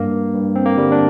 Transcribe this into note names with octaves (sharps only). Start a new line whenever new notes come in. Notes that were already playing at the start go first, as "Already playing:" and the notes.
Already playing: G2 A#3
G2
C4
A#3
D3 G3
D4